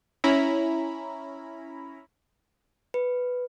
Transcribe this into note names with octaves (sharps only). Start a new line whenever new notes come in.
C#4 E4 A#5 B5
B4